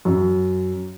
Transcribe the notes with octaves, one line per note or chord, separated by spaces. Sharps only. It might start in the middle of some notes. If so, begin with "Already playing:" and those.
F#2